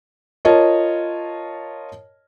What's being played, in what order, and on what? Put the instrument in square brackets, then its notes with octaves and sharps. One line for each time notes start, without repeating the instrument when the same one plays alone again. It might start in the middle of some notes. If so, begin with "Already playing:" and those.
[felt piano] F4 A#4 C#5 D#5 A5